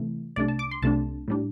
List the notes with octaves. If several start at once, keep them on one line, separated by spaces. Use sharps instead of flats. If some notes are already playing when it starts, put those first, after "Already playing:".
Already playing: C3 E3 A3 E4
C2 C3 A3 D4 D5
A5
D6
C6
C2 C3 A3 D4 A5
A2 G3 D4